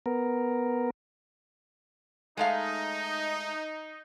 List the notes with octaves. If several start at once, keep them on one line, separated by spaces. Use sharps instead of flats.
B3 A#4
G#3 A3 D#4 F5